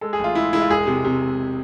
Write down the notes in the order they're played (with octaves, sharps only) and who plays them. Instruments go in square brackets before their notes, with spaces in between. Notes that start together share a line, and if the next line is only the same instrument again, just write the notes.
[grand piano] G#3 A4
G#4
A1 F4
G#3 E4
G#3 E4
F4
E1 G#4
C3
C3